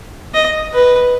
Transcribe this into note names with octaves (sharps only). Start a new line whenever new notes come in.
D#5
B4